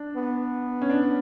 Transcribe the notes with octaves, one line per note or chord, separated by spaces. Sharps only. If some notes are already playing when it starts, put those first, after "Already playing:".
Already playing: D4
B3
C#4
D4